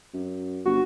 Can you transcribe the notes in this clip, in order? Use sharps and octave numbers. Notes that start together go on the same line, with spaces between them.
F#2
G1 F#4